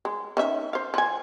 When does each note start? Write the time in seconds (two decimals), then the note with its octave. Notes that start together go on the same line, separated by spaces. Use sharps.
0.05 G#3
0.37 D#3 C#4 E5
0.73 C5 F5
0.94 F3 G#5